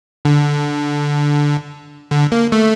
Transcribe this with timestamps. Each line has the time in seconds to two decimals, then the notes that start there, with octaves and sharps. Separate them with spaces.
0.25 D3
2.11 D3
2.32 A#3
2.52 A3